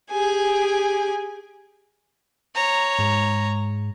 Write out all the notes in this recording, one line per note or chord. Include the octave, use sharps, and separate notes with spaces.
G4 G#4 G#5
C#5 A#5
G#2 G#3